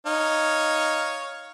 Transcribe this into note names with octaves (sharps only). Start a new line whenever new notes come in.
D#4 C#5 F5